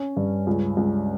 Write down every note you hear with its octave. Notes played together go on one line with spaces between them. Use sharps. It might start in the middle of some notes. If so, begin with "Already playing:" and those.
Already playing: C#4
G2
C#2
C#2